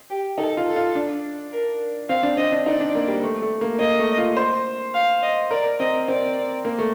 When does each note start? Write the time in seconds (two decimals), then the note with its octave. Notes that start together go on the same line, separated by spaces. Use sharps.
0.10 G4
0.38 D#4 A4
0.57 F4
0.67 A4
0.76 F4
0.95 D4
1.52 A#4
2.09 C4 F5
2.23 D4
2.37 C4 D#5
2.52 D4
2.66 D#4 D5
2.80 D4
2.95 A#3
3.08 G3
3.23 A3
3.42 A3
3.61 A#3
3.80 A#3 D#5
3.99 A3
4.18 F4
4.37 C5
4.94 F5
5.23 D#5
5.51 A#4 D5
5.80 C4 D#5
6.08 C4 D5
6.65 A#3
6.79 A3